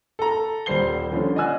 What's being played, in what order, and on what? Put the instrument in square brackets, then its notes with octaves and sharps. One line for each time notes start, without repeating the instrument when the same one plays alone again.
[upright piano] A4 A#5
D#1 G3 C5 C7 G7
D3 F3 C#4
D5 D#5 F#5 G#5 E6 F#6